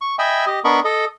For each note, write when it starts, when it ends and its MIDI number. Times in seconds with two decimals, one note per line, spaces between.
0.01 0.16 85
0.19 0.45 75
0.19 0.45 76
0.19 0.45 79
0.19 0.45 80
0.19 0.45 83
0.19 0.45 88
0.47 0.60 67
0.47 0.60 75
0.64 0.80 59
0.64 0.80 62
0.64 0.80 70
0.64 0.80 75
0.64 0.80 83
0.64 0.80 85
0.85 1.05 69
0.85 1.05 75